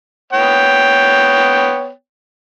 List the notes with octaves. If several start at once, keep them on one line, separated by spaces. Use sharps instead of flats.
B3 C#5 G5